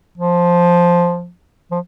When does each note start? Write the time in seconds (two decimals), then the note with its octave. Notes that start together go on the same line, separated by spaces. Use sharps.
0.17 F3
1.71 F3